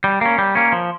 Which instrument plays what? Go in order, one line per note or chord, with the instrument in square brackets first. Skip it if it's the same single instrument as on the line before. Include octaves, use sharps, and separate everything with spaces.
[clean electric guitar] G3
A#3 C#4
G3
A#3 C#4
F3